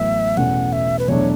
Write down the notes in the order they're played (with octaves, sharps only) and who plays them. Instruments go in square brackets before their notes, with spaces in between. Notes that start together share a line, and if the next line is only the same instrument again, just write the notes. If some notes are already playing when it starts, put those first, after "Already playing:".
Already playing: [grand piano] A1 A2 F#3 B3 [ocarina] E5
[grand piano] E2 B2 A3 C#4 [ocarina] F#5
[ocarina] E5
B4
[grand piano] E2 B2 F#3 A3 D4 [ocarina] C#5